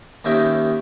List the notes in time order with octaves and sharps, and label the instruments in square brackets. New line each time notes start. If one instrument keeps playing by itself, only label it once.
[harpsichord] D#2 C#4 D#4 G4 E5